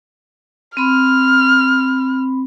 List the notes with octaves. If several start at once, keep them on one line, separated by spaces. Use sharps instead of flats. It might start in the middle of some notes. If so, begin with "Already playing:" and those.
C4 B5 F6